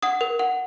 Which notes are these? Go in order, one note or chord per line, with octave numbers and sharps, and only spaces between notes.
F#5 D#6
A#4
F#5